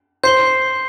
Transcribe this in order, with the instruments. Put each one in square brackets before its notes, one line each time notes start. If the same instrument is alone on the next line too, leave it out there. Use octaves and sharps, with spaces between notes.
[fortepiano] C5 [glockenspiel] G6 C7 G7